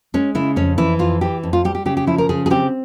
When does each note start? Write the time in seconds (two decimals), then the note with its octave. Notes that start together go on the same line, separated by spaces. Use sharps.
0.14 G#3 C#4
0.35 C#3 E4
0.56 F2 C#4
0.78 E3 E4
0.99 F2 F4
1.21 E3 G4
1.43 F2
1.53 F4
1.65 G3 G4
1.75 G4
1.86 C#3 G4
1.97 G4
2.07 F3 E4
2.18 A#4
2.29 C#3 G#4
2.46 G#4
2.50 C4 G4